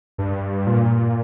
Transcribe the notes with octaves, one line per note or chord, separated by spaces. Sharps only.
G2
A#2